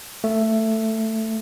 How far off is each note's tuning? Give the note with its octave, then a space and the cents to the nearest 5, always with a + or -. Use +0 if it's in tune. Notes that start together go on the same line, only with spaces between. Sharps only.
A3 +10